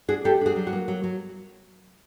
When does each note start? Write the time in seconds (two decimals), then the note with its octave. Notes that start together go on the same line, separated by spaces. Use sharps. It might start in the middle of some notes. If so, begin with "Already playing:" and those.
0.08 D4 F#4 G#4
0.24 D4 G4 A4
0.41 D4 F#4 G#4
0.56 F#3
0.67 F#4
0.73 A#3
0.88 F#3
1.04 F#3